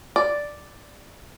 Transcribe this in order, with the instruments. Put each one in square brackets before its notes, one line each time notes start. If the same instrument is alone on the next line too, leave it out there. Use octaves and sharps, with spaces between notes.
[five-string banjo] D5